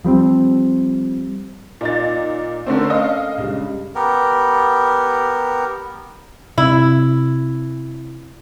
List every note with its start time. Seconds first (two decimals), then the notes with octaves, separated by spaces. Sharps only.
0.05 F3 G3 B3 C4
1.81 A#2 D#4 A6
2.66 D3 A3 C4 C#4 A4 A#4
2.90 D#5 F5
3.38 C#2 G2
3.95 B3 G4 A#4
6.58 C3 E4